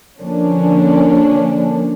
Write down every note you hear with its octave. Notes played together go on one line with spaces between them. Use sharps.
D3 F3 A#3 C#4 D4